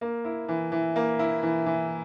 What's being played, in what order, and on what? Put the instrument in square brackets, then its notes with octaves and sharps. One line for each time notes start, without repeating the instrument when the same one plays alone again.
[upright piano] A#3
E4
E3
E3
A#3
E4
E3
E3